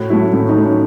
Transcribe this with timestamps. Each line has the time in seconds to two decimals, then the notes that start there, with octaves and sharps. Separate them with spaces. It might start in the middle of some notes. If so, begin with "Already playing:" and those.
Already playing: A2 F#4
0.10 F#3 A3 E4
0.33 A2 C#4
0.49 D#4
0.57 F#3 A3
0.64 C#4